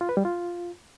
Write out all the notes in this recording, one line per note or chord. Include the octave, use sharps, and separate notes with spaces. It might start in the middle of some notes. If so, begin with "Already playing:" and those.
F4
B4
G3
F4